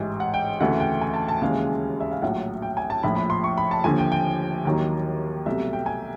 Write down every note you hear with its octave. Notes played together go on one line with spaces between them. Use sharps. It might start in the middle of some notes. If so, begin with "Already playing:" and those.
Already playing: A1 G#2 E3
F#5
G5
D2 C#3 E3 A3 F#5
G5
G#5
A5
A5
D#2 C#3 E3 G#3 F5
E5
F5
A#1 A2 F#3 F#5
G5
G#5
A5
A#1 A2 F3 B5
B5
C6
C#6
B5
A5
D#2 D3 F3 G#5
G5
G5
D#2 D#3 F#3 A#3
C2 B2 F#3 A3 E5
G5
G#5